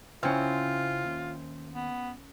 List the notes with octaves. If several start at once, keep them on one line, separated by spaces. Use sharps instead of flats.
C#3 E3 C4 C#4 E4 F4 C5 F6
D#2
B3